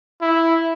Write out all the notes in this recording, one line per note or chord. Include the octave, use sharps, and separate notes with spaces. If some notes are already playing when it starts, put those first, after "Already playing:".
E4